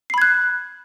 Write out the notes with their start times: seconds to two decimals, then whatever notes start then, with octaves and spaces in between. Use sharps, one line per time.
0.10 C7
0.14 B5
0.18 G#6
0.22 F#6